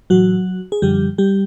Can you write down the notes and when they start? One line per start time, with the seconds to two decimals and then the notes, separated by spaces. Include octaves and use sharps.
0.10 A2 E3 F#3 F#4
0.72 G#4
0.82 F#2 D3 F3 G3 G4
1.18 G3 G4